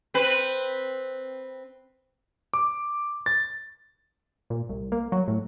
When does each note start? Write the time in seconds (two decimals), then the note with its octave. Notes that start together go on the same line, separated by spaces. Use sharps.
0.14 C4 B4
2.54 D6
3.26 A6
4.50 A#2
4.69 C2
4.92 A#3
5.12 F#3
5.28 A2